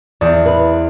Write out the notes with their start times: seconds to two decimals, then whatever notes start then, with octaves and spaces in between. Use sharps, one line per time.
0.21 E2 C4 D5 D#6
0.46 B4